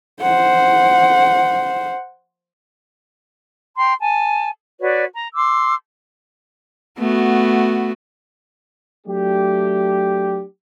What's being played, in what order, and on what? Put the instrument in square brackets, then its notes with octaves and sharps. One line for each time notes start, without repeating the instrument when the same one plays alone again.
[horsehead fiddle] C5 F#5
[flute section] G5 A#5 C6
G#5 A5
F#4 B4 C#5 D5
A#5
C6 D6 E6
[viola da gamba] A3 B3 F#4
[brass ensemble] F#3 A3 D4 G4